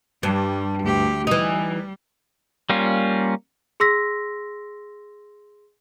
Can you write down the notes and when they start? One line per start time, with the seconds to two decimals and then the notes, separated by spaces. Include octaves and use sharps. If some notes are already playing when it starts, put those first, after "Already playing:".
0.23 G2 G3
0.82 D2 G4
1.27 E3 G3 D#4
2.70 G3 A#3 C#4 F4
3.80 G#4 C6 E6 A#6 B6